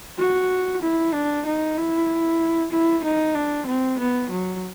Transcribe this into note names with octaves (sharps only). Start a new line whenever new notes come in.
F#4
E4
D4
D#4
E4
E4
D#4
D4
C4
B3
F#3